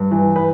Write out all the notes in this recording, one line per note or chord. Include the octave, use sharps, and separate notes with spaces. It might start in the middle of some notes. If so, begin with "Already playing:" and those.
Already playing: G2
E3
B4